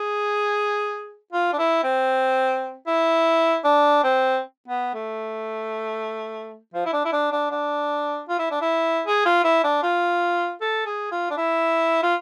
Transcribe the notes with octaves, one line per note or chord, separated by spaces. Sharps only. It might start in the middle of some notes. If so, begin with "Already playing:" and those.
Already playing: G#4
F4
D4
E4
C4
E4
D4
C4
B3
A3
F3
E4
D4
E4
D4
D4
D4
F4
E4
D4
E4
G#4
F4
E4
D4
F4
A4
G#4
F4
D4
E4
F4